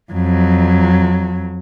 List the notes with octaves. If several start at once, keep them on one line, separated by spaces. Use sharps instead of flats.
F2 F#3